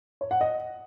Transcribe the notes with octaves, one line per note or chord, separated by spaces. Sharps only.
C#5
F#5
D#5